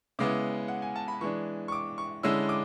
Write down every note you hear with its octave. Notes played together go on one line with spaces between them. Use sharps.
C#3 G#3 B3 E4 D6
F#5
G#5
A5
B5
E3 G#3 D4 C#6
C#6
D6
C#6
D3 G#3 C#4 E4 E6
D6